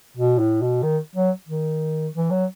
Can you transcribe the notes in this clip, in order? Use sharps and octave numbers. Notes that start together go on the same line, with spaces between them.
B2
A2
B2
D#3
F#3
D#3
E3
F#3